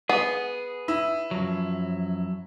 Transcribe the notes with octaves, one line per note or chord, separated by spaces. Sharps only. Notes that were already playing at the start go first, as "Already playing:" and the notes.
B3 G#4
E4
F#2 F3 F#3